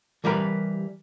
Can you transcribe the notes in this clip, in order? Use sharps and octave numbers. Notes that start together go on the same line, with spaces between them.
E3 G3 G4 A#4 B4